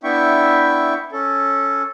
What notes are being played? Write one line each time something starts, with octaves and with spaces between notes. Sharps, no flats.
B3 D4 E4 E5 G5 C#6
C#4 A4